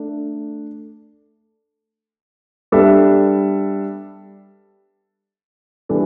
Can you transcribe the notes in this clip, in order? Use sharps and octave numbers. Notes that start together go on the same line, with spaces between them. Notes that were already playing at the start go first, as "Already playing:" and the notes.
Already playing: A3 D4
G3 B3 D4 A4 E5
E3 G3 D4 A4